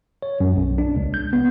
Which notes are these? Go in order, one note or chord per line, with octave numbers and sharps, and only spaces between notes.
C#5
F#2
B1
D4
C#2
G6
B3